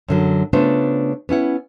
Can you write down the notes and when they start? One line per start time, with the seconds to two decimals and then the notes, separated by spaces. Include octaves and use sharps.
0.08 F#2 D3 F#3
0.53 C#3 A3 B3 D4 F4 C5
1.29 B3 C#4 E4 F#5